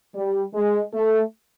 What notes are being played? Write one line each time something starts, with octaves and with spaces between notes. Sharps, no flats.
G3
G#3
A3